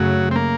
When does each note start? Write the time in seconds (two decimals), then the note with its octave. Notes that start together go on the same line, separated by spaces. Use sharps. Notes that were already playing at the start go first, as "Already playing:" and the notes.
Already playing: F#2 C#3 F#3 A3
0.31 C4
0.36 A#3